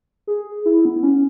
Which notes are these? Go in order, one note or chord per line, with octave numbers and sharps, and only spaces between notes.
G#4
E4
B3
C#4